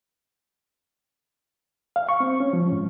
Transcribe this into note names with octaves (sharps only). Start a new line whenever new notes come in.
F5
C#6
C4
C#4
F3
G#2